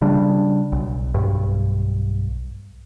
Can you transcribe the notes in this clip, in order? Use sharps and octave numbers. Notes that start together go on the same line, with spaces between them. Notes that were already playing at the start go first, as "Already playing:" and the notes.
C#3 G3 D4
B1
B1 G2